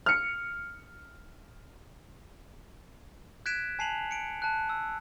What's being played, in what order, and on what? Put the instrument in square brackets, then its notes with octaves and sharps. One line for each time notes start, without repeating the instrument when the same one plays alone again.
[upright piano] F6 C#7
[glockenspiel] F#6 G#6 B6 D7 E7
G#5 A5 C7 D#7 F7 F#7
C#7 D7
A5 F#6
E6